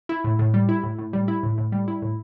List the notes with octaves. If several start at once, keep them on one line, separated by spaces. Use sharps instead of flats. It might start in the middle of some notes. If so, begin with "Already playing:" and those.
E4
A2
A2
G3
E4
A2
A2
G3
E4
A2
A2
G3
E4
A2